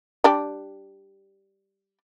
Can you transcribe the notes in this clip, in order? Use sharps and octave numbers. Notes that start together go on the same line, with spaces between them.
G3 D4 G4